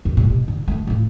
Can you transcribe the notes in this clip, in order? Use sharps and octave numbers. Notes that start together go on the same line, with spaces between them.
C2 F2
C2 A#2
B2
D3
D3 A3
A2 F3